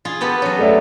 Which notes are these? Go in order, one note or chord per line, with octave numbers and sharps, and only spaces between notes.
F4 G#4
B3 G4 A4
F#3 C#4
A3 D5 E5